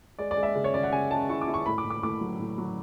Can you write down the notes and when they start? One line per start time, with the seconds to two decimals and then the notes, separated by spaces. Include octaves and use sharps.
0.19 G#3 D5
0.31 D5
0.37 G#3
0.43 E5
0.55 C#3
0.64 C#5
0.74 C#4 D5
0.83 F#5
0.92 C#3 G#5
1.10 G#3 A5
1.29 E4 C#6
1.41 D6
1.48 E4
1.54 C#6
1.66 A2 B5
1.78 D6
1.85 A2
1.90 D6
2.03 A2 D6
2.21 F#3
2.40 A2
2.58 F#3